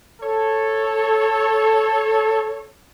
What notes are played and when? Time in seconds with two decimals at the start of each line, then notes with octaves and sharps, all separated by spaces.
0.21 A4 C#5